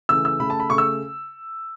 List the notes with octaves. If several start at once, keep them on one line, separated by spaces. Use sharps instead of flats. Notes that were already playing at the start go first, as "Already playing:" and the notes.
C#3 E3 A3 E6
E6
C#3 A3 B5
A5
B5
C#3 A3 C#6
E6